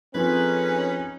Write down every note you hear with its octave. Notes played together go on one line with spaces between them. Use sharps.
F3 C4 C#4 D#4 G#4 A4 B4